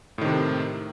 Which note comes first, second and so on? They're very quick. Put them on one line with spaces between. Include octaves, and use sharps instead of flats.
A2 D#3 C3